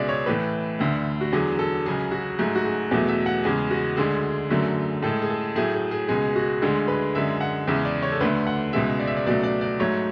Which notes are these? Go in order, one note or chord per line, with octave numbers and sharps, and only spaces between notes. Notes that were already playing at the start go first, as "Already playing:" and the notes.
Already playing: C#2 B2 G#3 D5 E5
C#5
A2 E3 A3 B4
D2 D3 A3
F#4
E2 D3 F#3 G#4
A4
C#2 C#3 F#3 G#4
F#4
G#2 F#3 A3 G#4
F#4
G#4
E2 B2 F#3 A3 G#4
E5
F#5
E2 C#3 G#3 G#4
F#4
D2 D3 G#3 G#4
F#2 D3 F#3 A3
A2 G#3 A4
G#4
A4
A2 F#3 A3 G#4
G#4
G#4
C#2 B2 G#3 G#4
F#4
D2 D3 G#3 G#4
B4
F#2 D3 G#3 E5
F#5
E2 C#3 G#3 E5
D5
C#5
A4
D2 D3 A3 B4
F#5
C#2 B2 G#3 E5
D5
E5
D5
C#2 B2 F#3 A3 D5
D5
D5
G#2 F#3 A3 C#5